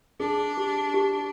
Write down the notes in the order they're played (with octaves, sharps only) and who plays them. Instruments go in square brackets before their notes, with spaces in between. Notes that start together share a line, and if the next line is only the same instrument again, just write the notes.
[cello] D4 [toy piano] G#4
[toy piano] G4
G4